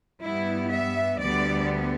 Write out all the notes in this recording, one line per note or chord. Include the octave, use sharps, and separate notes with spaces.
G2 G3 B3 E4
E5
D2 D3 G3 B3 D5